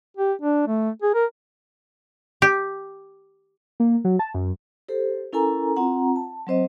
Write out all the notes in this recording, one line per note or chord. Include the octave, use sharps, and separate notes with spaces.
G4
D4
A3
G#4
A#4
G4
A#3
F#3
A5
F#2
G4 A4 C5
C#4 E4 A4 A#4 G#5 A#5
C4 F4 F#5 A#5
A5
F#3 C4 C5 D#5